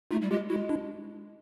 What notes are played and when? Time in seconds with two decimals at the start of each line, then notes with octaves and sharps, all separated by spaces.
0.11 A3 D#4 F4
0.21 G3
0.31 G#3 F4 G4
0.50 G#3 E4 F#4
0.69 D4 E4